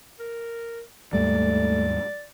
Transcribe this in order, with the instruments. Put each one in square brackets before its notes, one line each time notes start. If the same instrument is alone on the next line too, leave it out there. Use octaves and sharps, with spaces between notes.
[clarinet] A#4
[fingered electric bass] D#2 G#2 G3 [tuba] A3 [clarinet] D5